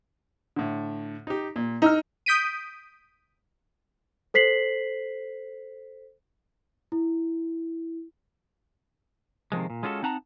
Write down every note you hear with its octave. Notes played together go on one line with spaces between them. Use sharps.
A2 D3
D#4 G4
A#2
D#4 A#5 E6 F6
D#6 G6 B6 D7 D#7
A4 C5 B6 C7 F#7
E4
C3 D#3 F3 G#3
A#2
G#3 C#4 F4 F#4 G#4 A4
C4 D#4 F#5 A5 A#5